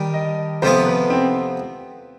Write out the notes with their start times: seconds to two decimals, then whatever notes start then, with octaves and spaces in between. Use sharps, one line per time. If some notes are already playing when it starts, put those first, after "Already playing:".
Already playing: D#3 G3 D4
0.14 D#5
0.62 F2 C3 F3 B3 C5
0.86 B4
1.10 C4